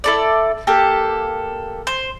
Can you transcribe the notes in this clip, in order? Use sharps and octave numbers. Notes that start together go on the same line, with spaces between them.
E4 A4 D5
A#3 G4 A4
C5